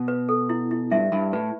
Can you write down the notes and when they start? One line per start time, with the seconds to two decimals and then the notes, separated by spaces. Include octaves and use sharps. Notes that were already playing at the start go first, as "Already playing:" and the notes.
Already playing: B2
0.08 B4
0.29 A4
0.49 E4
0.71 E4
0.91 G2 E5
1.12 G2 B5
1.33 A2 B4